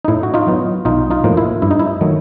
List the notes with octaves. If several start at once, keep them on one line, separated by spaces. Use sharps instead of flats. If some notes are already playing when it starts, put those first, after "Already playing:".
D#4
A2 E4
F#4
D#4 F4
F#3 B3
B1 D#4 F4
D#4 F4
A2 F3 A#3
E4
G2 E4
D#4
E4
D#3 F#3 A3